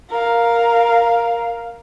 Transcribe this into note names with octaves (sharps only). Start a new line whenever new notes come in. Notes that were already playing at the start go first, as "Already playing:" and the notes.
A#4 F5